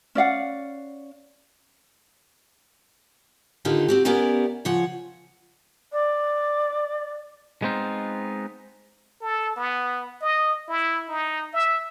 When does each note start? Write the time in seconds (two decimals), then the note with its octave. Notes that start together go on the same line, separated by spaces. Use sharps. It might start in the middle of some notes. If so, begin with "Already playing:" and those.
0.15 C#4 D5 F5 F#5
3.65 D3 D#3 D#4 F4 G4
3.88 C4 F#4 G4
4.05 B3 C#4 G4 A#4 D5 E5
4.65 C#3 F3 C#5 F#5
5.92 D5
7.62 G#3 B3 C4 D#4 F4
9.21 A4
9.57 B3
10.21 D#5
10.68 E4
11.09 D#4
11.53 E5